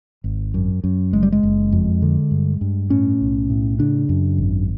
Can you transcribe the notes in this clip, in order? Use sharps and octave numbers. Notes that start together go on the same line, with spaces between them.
G#1
F#2
F#2
F#1 G#3
G3
G#3
F#1
F2
D3
G2
G2
A2 C#4
B1
A2
C#3 D4
F#2
G#1